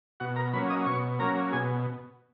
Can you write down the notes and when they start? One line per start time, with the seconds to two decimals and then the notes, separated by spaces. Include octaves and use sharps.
0.20 B2 F#4 F#5
0.36 A#4 A#5
0.53 F#3 A#3 C#4 B4 B5
0.70 D#5 D#6
0.86 B2 C#5 C#6
1.19 F#3 A#3 C#4 A#4 A#5
1.52 B2 G#4 G#5